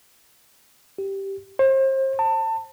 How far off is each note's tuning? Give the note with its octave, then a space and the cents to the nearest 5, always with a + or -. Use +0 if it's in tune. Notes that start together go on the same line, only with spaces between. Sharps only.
G4 -5
C5 +35
A5 +25